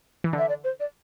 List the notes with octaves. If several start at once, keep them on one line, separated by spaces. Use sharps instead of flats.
E3
D3
E5
D5
C5
D5